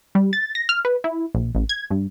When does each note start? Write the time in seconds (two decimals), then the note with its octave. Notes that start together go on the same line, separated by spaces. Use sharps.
0.15 G3
0.33 A6
0.55 A#6
0.69 F6
0.85 B4
1.04 E4
1.35 A#1
1.55 A1
1.69 G#6
1.90 G2